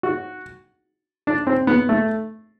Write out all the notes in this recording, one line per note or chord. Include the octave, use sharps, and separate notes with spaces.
F#4
D4
C4
B3
A3